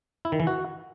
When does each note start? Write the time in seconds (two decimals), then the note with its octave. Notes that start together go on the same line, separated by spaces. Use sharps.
0.25 E4
0.32 D#3
0.40 E3
0.47 F#4